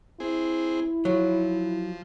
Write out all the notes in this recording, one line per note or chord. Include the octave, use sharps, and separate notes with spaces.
C4 E4 G#4
F3 F#3